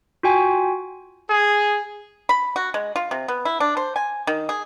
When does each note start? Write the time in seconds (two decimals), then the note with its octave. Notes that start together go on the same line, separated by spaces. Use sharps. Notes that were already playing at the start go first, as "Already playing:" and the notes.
0.23 F4 F#4 G5 G#5
1.30 G#4
2.29 B5
2.56 F#4
2.74 G#3
2.96 F4
3.11 C3
3.28 B3
3.45 E4
3.60 D4
3.77 C5
3.96 G#5
4.27 D#3
4.49 G#4